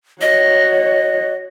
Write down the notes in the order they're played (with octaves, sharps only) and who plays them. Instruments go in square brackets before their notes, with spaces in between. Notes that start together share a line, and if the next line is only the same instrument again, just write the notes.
[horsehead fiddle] F#4 C#5 [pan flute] D#5